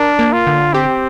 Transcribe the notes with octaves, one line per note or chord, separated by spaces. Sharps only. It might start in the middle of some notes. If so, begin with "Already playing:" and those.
Already playing: D4 A#4
A#3
F4
D3
C4 G4